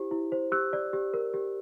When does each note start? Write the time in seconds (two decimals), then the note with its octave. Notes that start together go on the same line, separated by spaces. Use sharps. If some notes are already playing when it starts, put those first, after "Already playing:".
Already playing: E4 G4 C5
0.11 E4
0.32 C5
0.52 G4 E6 F#6
0.73 D5
0.93 G4
1.14 A#4
1.34 G4